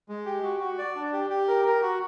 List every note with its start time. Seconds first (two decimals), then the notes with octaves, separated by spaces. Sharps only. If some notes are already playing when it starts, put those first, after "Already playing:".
0.09 G#3
0.26 G4
0.43 F#4
0.60 F#4
0.78 D5
0.95 D4
1.13 G4
1.30 G4
1.48 A#4
1.65 A#4
1.82 F#4